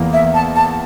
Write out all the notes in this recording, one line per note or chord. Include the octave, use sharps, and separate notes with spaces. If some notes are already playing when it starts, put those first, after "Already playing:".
Already playing: E2 E3 A#3
E5
A5
A5